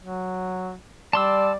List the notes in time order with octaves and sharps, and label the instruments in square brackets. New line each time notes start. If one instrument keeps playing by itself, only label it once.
[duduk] F#3
[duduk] G3 [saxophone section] D5 [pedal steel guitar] A5 C6 E6